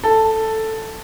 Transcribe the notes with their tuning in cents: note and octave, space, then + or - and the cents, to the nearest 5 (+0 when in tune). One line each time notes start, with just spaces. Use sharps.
A4 +5